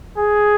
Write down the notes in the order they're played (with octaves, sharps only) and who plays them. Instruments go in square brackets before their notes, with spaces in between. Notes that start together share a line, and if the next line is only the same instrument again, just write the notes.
[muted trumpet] G#4